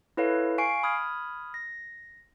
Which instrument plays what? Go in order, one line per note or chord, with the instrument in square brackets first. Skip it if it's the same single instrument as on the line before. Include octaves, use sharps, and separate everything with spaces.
[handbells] E4 A4 B4 C#5 F5
F5 G#5 C#6 C7 D7
B5 D#6 F6 G#6
A#6